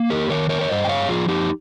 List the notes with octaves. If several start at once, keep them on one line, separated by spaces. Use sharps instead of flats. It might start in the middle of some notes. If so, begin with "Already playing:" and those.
Already playing: A#3
G4 A#4
D#3 A#4 C#5
A#4 C#5
C#5
G2 C5 D#5
G5
C#5 F5
F3 F4 G#4
D#4 G4